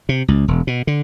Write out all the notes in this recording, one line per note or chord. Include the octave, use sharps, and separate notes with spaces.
C3
C#2
E1
B2
D3